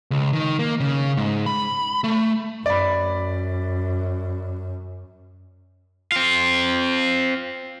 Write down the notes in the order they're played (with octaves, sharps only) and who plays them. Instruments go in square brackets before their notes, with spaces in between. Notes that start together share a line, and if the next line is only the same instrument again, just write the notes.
[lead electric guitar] C#2
D#3
A#3
C#3
G#2
B5
A3
[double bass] F#2 [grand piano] D5 B5
[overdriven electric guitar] C4 F4